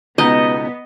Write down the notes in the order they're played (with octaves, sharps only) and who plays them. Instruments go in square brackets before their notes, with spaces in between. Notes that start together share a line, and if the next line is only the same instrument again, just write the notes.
[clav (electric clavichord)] C#2 B2 D#4 [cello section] B3 [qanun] D#5